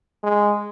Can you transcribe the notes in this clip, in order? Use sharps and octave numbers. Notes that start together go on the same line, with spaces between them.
G#3